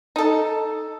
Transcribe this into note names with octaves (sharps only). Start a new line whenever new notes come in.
D#4 A4